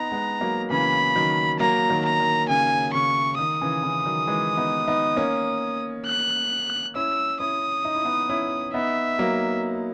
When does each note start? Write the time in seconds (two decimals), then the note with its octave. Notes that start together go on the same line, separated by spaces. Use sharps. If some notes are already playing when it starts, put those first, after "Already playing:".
Already playing: B3 D#4 A#5
0.12 G#3 B3
0.41 F#3 A#3
0.70 C#3 E3 B5
1.15 D#3 F#3
1.60 F#3 A#3 A#5
1.89 D#3 F#3
2.05 A#5
2.20 D#3
2.49 C#3 G#5
2.94 C#3 C#6
3.39 D#3 D#6
3.61 C#3 E3
3.83 C#3 E3
4.05 D#3 F#3
4.27 E3 G#3
4.57 B3 D#4
4.88 B3 D#4
5.17 A#3 C#4
6.06 F#6
6.95 C#4 E4 E6
7.40 C#4 E4 D#6
7.85 D#4
7.95 E4
8.05 B3 D#4
8.29 C#4 E4
8.74 B3 D#4 E5
9.19 F#3 A#3